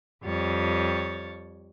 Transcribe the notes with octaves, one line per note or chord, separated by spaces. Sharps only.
F2 G3 C#5 A6